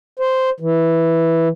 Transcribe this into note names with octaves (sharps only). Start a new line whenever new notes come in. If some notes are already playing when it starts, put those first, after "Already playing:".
C5
E3